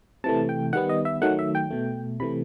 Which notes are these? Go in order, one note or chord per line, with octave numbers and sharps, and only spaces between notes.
C3 E3 A3 A5
G5
D#3 G3 B3 F#5
D#5
E5
D#3 F#3 A3 F#5
E5
G5
B2 A3
C3 E3 A3 B5